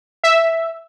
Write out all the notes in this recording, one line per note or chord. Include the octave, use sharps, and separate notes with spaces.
E5